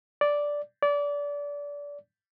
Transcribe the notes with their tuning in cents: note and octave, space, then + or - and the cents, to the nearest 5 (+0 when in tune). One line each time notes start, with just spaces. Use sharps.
D5 -5
D5 -25